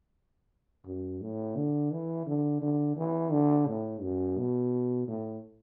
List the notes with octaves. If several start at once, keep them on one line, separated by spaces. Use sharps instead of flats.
F#2
A2
D3
E3
D3
D3
E3
D3
A2
F#2
B2
A2